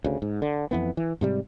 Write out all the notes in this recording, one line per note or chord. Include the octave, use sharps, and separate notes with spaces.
D2 C#3
G#2
D3
F2 E3 B3
E3
G#2 C3 G3